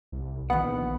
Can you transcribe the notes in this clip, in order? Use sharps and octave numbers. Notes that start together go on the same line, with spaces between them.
C2
A#1 D#3 B3 F#5